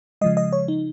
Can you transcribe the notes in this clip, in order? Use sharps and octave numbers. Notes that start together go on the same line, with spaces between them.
C#3 F3 G#3 D#5
D#5
C#5
D#4